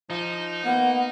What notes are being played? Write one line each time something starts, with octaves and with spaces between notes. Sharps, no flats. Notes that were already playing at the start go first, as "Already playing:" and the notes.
F3 D#4
A#3 B3 F#5